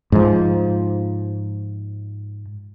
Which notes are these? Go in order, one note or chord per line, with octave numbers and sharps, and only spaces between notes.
G#2 F3